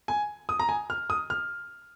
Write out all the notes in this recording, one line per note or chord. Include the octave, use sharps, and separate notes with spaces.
G#5
D#6
A#5
G#5
F6
D#6
F6